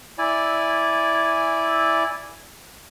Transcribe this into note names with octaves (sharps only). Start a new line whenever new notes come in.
E4 D5 G#5